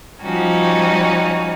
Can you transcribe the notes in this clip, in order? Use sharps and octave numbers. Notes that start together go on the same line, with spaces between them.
F3 G3 C#4 D#4 F#4